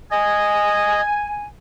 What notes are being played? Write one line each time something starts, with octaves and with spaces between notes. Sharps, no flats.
D#5 G#5